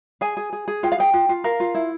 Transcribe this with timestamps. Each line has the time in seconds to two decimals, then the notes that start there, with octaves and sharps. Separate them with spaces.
0.21 G#4 G#5
0.37 G#4
0.53 G#4
0.68 G#4
0.83 F4 G5
0.92 F5
0.98 G#4 G5
1.14 F4
1.29 F4
1.44 A#4 F5
1.60 F4
1.75 E4